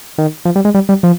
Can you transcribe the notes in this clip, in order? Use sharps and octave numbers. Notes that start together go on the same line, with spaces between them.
D#3
F3
G3
G#3
G3
G3
F3